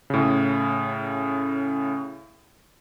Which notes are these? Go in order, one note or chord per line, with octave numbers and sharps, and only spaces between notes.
A2 C#3